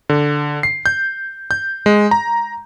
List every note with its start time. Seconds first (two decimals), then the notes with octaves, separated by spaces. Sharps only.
0.09 D3
0.63 C7
0.86 G6
1.51 G6
1.86 G#3
2.11 A#5